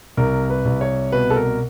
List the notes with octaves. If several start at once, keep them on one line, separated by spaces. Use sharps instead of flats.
C2 A#4
B4
C2
C#5
B2 B4
A4
A#4